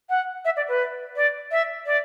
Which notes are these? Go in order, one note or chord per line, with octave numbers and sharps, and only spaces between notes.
F#5
E5
D5
B4
D5
E5
D5